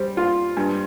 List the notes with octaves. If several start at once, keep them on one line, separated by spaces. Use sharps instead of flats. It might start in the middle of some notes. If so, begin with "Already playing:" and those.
Already playing: G3 C5
F4
G2